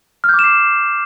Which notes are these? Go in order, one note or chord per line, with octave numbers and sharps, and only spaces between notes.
F6
G6
D6
E7
C7